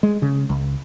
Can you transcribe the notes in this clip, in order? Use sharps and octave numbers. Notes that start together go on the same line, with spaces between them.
G#3
C#3
C#2